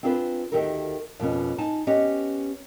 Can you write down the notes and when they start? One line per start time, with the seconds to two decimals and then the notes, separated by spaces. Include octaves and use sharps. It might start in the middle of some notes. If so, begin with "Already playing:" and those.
0.03 C4 D4 F4 G#4 A#4 B4
0.52 D2 G#2 D#3 G4 A4 A#4
1.20 F2 B2 A#3 B3 C#4
1.58 D#4 G#5 A5
1.87 B3 C#4 G4 D#5